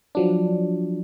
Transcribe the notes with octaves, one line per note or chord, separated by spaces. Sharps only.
F3 F#3 D4